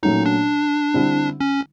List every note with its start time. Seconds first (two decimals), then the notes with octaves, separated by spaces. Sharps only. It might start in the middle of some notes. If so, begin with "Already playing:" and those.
0.03 A#2 F#3 A3 C#4 D#4
0.26 D4
0.94 D3 G3 C4 E4
1.40 C#4